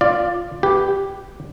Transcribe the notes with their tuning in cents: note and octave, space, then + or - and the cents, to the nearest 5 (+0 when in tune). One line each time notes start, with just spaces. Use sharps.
F4 +0 D5 +10
G4 +0 B4 +0